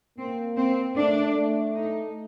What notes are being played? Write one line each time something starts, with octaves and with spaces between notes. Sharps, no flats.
A#3 C4
C4
A3 D4
A3
D#4